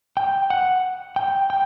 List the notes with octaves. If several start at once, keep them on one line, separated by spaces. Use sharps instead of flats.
G5
F#5
G5
G5